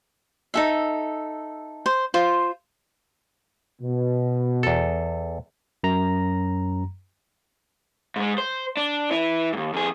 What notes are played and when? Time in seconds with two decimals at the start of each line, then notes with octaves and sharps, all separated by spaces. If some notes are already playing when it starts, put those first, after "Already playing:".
0.54 D#4 A4 E5
1.86 C5
2.14 F4 C5
3.82 B2
4.63 E2 A4
5.84 F#2 A#5 A#6
8.16 G#2 G#3
8.38 C5
8.77 D4
9.11 E3 E4
9.53 D#2 G#2
9.74 F2 G#4